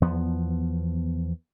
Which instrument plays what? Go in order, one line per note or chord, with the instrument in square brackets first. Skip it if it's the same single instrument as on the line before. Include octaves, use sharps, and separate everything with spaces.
[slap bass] E2 F3 B3